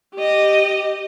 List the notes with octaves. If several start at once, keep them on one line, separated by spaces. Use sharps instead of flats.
G4 D#5